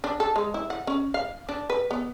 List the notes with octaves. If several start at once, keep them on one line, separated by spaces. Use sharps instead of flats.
D4
A4
G#3
E4
F#5
C#4
F5
D4
B4
B3